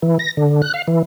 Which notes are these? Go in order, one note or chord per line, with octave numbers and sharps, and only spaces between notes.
E3
A#6
D3
F#6
F5
E3